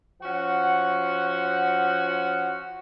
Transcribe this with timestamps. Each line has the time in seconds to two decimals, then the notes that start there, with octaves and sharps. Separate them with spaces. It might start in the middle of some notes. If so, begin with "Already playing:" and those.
0.22 F3 C#4 F#4 F#5